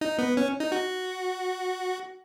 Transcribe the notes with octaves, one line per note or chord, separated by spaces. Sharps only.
D#4
B3
C#4
D#4
F#4